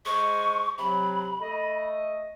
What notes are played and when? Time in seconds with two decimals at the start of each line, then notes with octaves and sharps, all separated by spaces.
0.05 G#3 C5 D#5 C#6
0.78 C3 F#3 B5
1.40 A3 D#5